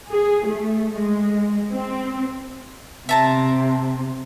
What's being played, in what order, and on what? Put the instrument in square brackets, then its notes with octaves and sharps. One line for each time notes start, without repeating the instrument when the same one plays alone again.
[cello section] G#4
A3
G#3
C4
[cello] C3 [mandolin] E5 A5 A#5